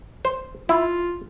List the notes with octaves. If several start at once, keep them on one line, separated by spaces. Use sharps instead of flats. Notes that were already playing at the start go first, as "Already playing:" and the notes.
C5
E4 F4